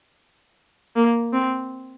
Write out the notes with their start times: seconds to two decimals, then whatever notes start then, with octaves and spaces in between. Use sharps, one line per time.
0.95 A#3
1.33 C4